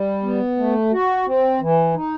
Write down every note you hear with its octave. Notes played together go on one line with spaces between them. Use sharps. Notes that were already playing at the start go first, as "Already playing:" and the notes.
Already playing: G3
B3
A3
F#4
C4
E3
D#4